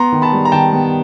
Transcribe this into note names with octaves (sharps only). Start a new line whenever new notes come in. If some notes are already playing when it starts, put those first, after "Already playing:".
Already playing: B3 A#5 C6
D#3
A5 B5
G3
A#5
D#3 G5 A5
B3